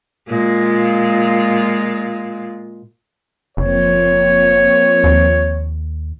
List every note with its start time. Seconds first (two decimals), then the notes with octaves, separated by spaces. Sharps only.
0.28 A#2 G#3 F4
3.57 F#1 F3 A#3 C4 C#5
5.04 D#2